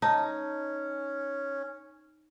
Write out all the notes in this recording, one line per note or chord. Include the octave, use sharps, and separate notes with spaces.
C#4 D#4 A5